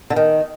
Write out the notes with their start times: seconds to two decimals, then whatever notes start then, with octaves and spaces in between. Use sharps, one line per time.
0.10 D3
0.16 D#3